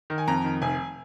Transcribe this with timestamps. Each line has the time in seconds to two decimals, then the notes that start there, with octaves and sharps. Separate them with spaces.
0.10 D#3
0.18 G#5
0.28 F2 A#5
0.44 D#3
0.62 F1 G#5